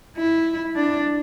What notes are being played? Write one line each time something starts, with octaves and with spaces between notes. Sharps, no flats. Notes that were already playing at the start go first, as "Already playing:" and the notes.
E4
D4